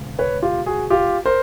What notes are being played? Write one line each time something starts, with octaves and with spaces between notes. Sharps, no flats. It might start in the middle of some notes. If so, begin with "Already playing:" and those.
Already playing: E1 D2 C#3 G#3
B4 C#5
F4 G4
F#4 G#4
F4 G4
A#4 C5